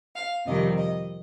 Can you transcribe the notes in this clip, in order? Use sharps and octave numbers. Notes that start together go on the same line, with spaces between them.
F5
F2 C3 D#3 G3 C4 D#5
D#5